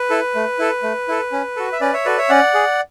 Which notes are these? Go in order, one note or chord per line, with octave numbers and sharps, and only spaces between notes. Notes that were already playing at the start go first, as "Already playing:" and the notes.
Already playing: B4
E4 A4
A3
E4 A4
A3
E4 A4
C#4
F#4 A4
E5
C#4 B4 D5
C#5 E5
F#4 A4 B4 D5
C#5 E5
C#4 D5 F#5
G#4